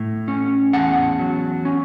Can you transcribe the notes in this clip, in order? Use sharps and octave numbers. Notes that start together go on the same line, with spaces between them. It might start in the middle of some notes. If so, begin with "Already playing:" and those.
Already playing: A2
C#4
E2 F#5 A5
F#3
C#4